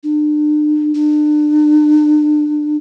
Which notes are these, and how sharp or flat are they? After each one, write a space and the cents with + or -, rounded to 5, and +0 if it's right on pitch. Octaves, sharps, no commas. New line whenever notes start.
D4 +40
D4 +35